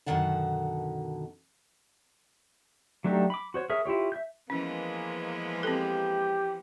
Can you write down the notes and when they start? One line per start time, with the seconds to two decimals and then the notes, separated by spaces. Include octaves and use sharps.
0.06 F#2 B2 D3 D#3 F#5 A5
3.04 F#3 A3 D4 D#4 G4
3.30 B5 D6
3.54 F#4 C5 C#5
3.70 G#4 A#4 C#5 E5
3.85 E4 F4 G4 C#5
4.12 E5 G6
4.50 E3 F3 G#3 A#3 B3 C#4
5.63 C4 G4 A4